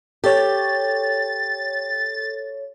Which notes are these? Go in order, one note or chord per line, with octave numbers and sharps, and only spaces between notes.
G4 A4 C#5 A6